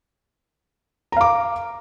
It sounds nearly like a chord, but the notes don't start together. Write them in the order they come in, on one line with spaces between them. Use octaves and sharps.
A#5 F5 D6